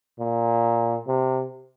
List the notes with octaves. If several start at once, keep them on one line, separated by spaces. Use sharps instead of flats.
A#2
C3